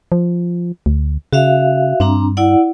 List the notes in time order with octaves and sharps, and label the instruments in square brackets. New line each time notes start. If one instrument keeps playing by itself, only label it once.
[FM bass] F3
D2
[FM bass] C#3 [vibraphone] F#4 E5 F5
[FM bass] G2 [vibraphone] C4 D4 A#5
[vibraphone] E4 D5 F#5